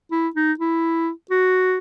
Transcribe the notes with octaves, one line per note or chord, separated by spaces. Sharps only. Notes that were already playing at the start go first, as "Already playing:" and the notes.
E4
D#4
E4
F#4